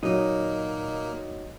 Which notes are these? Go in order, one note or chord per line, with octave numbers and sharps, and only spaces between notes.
A#2 F#3 A#3 D#4